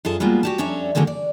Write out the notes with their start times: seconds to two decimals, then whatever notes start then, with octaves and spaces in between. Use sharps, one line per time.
0.05 F#2 F4 G#4 A4 D#5 A5
0.20 G3 G#3 A#3 B3 F4 F#4
0.43 F#4 G4 A5
0.58 F2 C#4 D4 C#5 E5 A#5
0.95 D3 F#3 G#3 A#3 C4
1.07 D5